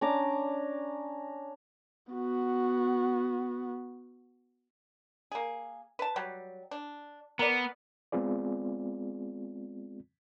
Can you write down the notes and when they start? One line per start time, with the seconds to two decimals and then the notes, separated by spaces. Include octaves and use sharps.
0.01 C#4 D4 A#5 D6
2.13 B3 F#4
5.32 A#3 G#4
5.99 B4 A5
6.16 F#3 G3
6.71 D4
7.39 B3 A#4 D5
8.12 G#3 B3 C4 F4 G#4 D5